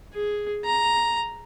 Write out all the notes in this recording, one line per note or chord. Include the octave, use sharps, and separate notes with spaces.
G#4
A#5